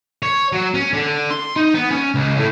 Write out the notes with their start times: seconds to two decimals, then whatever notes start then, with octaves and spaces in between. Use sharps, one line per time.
0.23 C#5
0.53 F#3
0.74 C#4
0.94 D3
1.31 C6
1.56 D#4
1.74 B3
1.91 C#4
2.15 C#2
2.37 A2